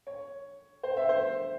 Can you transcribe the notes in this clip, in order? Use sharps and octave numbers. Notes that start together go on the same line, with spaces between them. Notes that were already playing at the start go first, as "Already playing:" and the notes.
C#5
C5
E5
C5